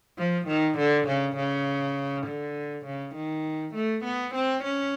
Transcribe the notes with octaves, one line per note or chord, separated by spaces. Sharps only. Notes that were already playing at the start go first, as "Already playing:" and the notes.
F3
D#3
D3
C#3
C#3
D3
C#3
D#3
A3
B3
C4
C#4